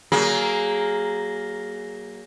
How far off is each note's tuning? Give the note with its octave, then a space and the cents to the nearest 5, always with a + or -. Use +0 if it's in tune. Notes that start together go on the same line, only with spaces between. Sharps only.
F#3 +30 A#3 +0 G#4 +0